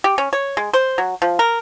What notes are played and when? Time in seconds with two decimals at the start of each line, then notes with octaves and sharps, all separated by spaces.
0.04 G4
0.18 C#4
0.33 C#5
0.57 G#3
0.73 C5
0.98 F#3
1.22 F3
1.39 A#4